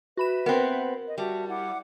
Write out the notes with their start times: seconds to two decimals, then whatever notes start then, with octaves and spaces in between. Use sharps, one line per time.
0.17 F#4 B4 E5 B5 E7
0.46 B3 C4 A#4
1.06 D#5
1.18 G3 F#4 E5 A5
1.48 E4 F#5 D6